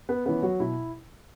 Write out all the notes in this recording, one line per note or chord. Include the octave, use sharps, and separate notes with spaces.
B3 B4
E3 B3 C#4 B4
F#3 F#4
B2 E4